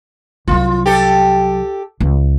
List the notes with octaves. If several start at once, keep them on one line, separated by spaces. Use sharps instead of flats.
C2 F#3 F4
G4 A4
C#2